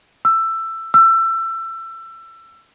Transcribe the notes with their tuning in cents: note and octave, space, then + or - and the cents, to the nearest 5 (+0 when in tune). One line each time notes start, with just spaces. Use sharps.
E6 +15
E6 +25